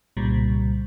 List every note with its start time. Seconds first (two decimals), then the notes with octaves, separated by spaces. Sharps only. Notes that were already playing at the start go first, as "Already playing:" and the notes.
0.17 C2 A#2 C#3 G3